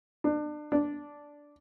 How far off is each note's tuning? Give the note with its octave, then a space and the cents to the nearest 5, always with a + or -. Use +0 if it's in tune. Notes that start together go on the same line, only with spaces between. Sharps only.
D4 +30
D4 -5